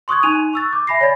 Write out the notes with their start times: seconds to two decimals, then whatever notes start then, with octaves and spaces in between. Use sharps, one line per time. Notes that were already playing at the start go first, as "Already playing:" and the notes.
0.08 C6 C#6 D#6 F#6 G#6
0.23 D#4 G#5 F#6 D#7 F7
0.53 C#6 E6 A6
0.72 D6 G6
0.87 E5 G#5 B5 A#6 C7
1.01 C#5 D5 G#5 B5 A6